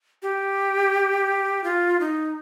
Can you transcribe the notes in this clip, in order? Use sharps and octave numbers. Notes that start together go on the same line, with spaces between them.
G4
F4
D#4